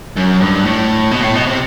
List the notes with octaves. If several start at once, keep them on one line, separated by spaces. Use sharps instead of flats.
F#2
G2
A2
B2
A2
B2
C3